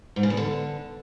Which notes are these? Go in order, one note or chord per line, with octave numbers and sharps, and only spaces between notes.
G#2
C#3
E2
D3